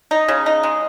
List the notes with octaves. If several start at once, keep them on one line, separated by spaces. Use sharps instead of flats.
D#4
C#3
D#4
G#3